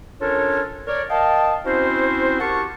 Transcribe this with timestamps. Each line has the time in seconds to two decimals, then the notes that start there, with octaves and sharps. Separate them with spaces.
0.21 C#4 D4 F4 A4 A#4 C#5
0.87 A#4 C#5 D5
1.10 A#4 D#5 F5 G5 A5
1.65 C4 C#4 E4 F#4 C5
2.40 G4 A#4 F#5 A5 C#6